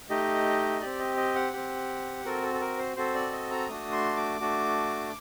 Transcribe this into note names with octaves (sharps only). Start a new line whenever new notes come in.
A3 D#4 G4 D#5
C4 G4 D5
D#5
D#5
F#5
C4 G4
C4 F#4 A4 A#4
A4
A4
A#4
C5
C4 F#4 A4 C5
D5
D#5
A#5
A3 D4 F#4 D#6
C6
D6
A3 D4 F#4